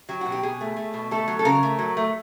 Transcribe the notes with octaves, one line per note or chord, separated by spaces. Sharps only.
F#3 G4
F#4
B2
G4
B2 G#4
A3
A3
B2
A3 A4
F#3
A4
C#3 A#4
A3
F#3
A3